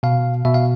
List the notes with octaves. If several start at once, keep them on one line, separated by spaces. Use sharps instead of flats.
B2 F5
B2 E5
F5